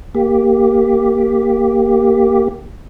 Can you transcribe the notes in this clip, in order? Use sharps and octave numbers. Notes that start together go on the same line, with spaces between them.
A#3 G4